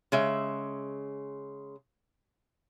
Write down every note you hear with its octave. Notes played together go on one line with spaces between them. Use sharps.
C#3 G#3 E5